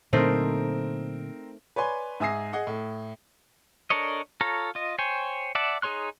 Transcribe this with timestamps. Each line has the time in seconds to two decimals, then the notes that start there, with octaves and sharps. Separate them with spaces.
0.13 A#2 D3 F#3 A3 C4 D#4 A#4 C5
1.76 B4 C#5 D5 G#5 C6
2.20 G#2 E5 G#5 D#6 A#6 C7
2.53 G#4 D#5 F#5
2.67 A2
3.90 D4 A4 A#4 C#5 D#5
4.41 F4 A4 C#5 A#5
4.75 F4 D#5
4.98 C5 C#5 G5 G#5
5.55 D5 E5 F#5 A5
5.82 D#4 G#4 C#5 C6 F#6